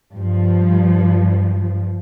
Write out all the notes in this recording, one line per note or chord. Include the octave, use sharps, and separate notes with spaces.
G2 F3